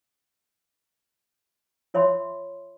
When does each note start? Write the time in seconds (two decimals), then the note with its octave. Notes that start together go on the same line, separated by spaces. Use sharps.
1.94 F4 C#5 E5 B5 C6